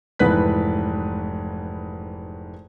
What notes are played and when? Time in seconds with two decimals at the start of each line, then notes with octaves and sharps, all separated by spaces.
0.19 F1 G#2 E3 B4 F#6 B6